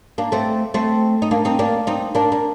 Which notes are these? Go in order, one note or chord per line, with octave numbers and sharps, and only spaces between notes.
A#3 D4
A3 C4
A3 C4
D#4
A#3 D4
C4 D#4
A#3 D4
C4 D#4
A#3 D4
A#3